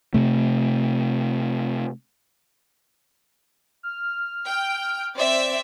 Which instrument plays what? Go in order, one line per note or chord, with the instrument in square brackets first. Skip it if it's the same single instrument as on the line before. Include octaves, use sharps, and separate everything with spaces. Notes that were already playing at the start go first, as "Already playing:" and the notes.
[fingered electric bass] C3 A3
[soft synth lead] F6
[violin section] G5
C4 D5 E5